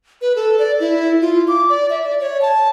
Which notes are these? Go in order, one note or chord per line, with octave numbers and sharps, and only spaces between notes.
B4
A4
D5
E4
F4
D6
D5
E5
D5
C#5
A5